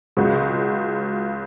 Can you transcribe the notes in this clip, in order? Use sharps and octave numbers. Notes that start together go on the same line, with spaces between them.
C#2 C#3 G#3 F#4